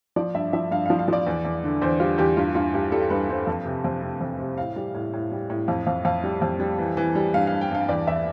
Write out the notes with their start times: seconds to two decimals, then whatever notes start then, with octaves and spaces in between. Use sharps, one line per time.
0.16 F3 D5
0.34 G2 E5
0.53 F3 E5
0.71 G2 F5
0.86 F3 F5
0.99 F5
1.08 F3 D5
1.27 E2
1.45 E2
1.64 D3
1.82 E2 C5
2.00 G3 F4
2.18 E2 G4
2.37 G2 F4
2.55 G2 F4
2.74 G2 G4
2.92 G3 A4
3.10 G2 B4
3.29 G2 C5
3.47 F2
3.66 C3
3.84 F2
4.02 C3
4.21 F2
4.39 C3
4.58 A2 F5
4.76 G3
4.94 A2
5.13 A2
5.31 G3
5.50 A2
5.68 F2 F5
5.86 F2 F5
6.05 F2 F5
6.24 G3
6.42 F2
6.60 G3
6.79 E3
6.97 E3
7.15 G3
7.34 G2 F5
7.47 F5
7.52 G2
7.61 G5
7.71 G2 F5
7.89 E2 D5
8.07 E2 E5